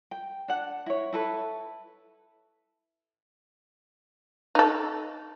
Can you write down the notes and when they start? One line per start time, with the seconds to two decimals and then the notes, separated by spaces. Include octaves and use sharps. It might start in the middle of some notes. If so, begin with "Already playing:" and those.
0.11 G5
0.48 D4 F#5
0.86 E4 C#5
1.13 E4 A4 B4
4.55 D#4 A4